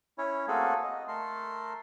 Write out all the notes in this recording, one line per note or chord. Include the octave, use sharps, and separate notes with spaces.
C#4 E4 C#5
A3 A#3 C4 F#4 G#4 A4
D#5
A3 A4 A#4 C6